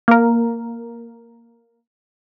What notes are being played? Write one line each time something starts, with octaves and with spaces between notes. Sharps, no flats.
A#3 A#4